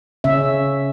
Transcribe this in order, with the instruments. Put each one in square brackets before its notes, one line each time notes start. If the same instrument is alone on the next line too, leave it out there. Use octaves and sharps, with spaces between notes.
[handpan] C#3 C#4 E5